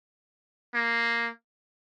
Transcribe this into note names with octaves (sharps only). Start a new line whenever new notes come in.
A#3